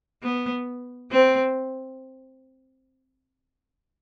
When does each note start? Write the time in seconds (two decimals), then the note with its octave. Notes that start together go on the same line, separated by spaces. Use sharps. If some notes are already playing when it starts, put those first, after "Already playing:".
0.23 B3
1.12 C4